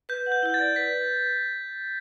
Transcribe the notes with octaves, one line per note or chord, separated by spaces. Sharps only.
B4 G6
F#5
G6
E4 G6
A6
D5
B4 B6